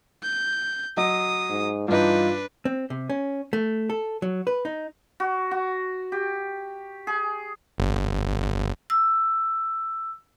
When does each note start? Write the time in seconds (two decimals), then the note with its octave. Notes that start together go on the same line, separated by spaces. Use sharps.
0.23 G6
0.97 F#3 D#5 D#6
1.50 G#2
1.88 G2 E3 D4 D#4 F4 B4
2.65 C4
2.90 C3
3.10 C#4
3.53 A3
3.90 A4
4.22 F#3
4.47 B4
4.65 D#4
5.20 F#4
5.51 F#4
6.12 G4
7.07 G#4
7.78 G1
8.90 E6